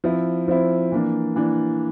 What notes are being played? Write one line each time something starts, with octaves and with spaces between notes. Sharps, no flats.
F3 C4 E4
F3 C4 E4
E3 A#3 D4
E3 A#3 D4